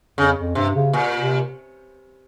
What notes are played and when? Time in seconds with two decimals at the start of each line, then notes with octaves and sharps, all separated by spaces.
0.18 F2 C#3
0.37 F2
0.55 G2 C3
0.75 C#3
0.93 A#2
1.19 C3